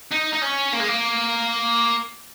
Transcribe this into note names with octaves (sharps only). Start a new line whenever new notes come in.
D#4
D#4
C#4
A#3
G#3
A#3